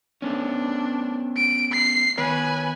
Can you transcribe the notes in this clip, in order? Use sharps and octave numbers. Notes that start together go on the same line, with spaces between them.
A3 B3 C#4 D4
D7
C7
D#3 B3 B4 C#5 G#5